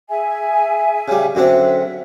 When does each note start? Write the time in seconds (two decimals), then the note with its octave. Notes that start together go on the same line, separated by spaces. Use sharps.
0.08 G#4 E5 G#5
1.08 C#3 G3
1.35 F#2 D3 C4 E5 F#5